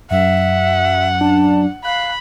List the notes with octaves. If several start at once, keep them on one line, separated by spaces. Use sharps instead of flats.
F#2 E5 F#5
D4 A5
F5 B5 F#6